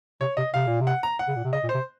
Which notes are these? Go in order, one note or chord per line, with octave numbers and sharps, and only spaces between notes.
C3 C#5
C3 D#5
C3 F5
A#2
C3
F#5
A#5
F#5
C#3
A#2
C3
C#3 D#5
A#2
C5
C3